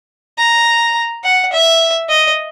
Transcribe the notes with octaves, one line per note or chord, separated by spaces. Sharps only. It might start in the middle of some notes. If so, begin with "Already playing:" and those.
A#5
F#5
E5
D#5